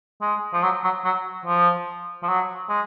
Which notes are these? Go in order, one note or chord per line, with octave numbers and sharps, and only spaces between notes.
G#3
F3
F#3
F#3
F#3
F3
F3
F#3
G#3